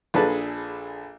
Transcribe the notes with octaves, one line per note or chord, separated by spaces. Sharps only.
A#1 D4 G#4 A4 B4 A5